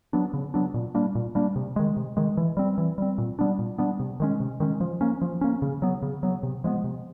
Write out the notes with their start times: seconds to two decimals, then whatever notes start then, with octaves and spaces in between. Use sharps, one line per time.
0.13 F#3 B3 D4
0.34 C#3
0.54 F#3 B3 D4
0.74 A#2
0.95 G3 A#3 D4
1.15 A#2
1.35 G3 A#3 D4
1.56 C3
1.76 D#3 G#3
1.97 C3
2.17 D#3 G#3
2.37 E3
2.57 G3 C4
2.78 E3
2.98 G3 C4
3.18 A#2
3.39 G3 B3 D4
3.59 A#2
3.78 G3 B3 D4
4.00 C3
4.20 D#3 G#3 C#4
4.40 C3
4.60 D#3 G#3 C#4
4.81 F3
5.01 A#3 C#4
5.21 F3
5.41 A#3 C#4
5.62 C#3
5.82 F#3 B3
6.02 C#3
6.23 F#3 B3
6.43 C3
6.64 F3 G#3 B3
6.84 C3